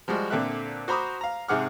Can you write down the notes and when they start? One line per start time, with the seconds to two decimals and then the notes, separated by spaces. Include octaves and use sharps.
0.08 F3 G3 G#3 F#4
0.30 A#2 D3 C4 A4 E5 F#6
0.88 F#4 C5 A#5 B5 D6 D#6
1.21 F5 A#5
1.48 G#2 C3 G#4 F#5 D6 F6